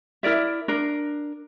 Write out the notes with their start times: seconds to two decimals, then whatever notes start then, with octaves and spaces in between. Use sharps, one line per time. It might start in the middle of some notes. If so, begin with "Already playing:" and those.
0.23 E4 A#4 D5 E5
0.68 D4 A#4